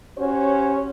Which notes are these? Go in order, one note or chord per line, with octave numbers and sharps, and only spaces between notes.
C#4 F#4 G4 C5 C#5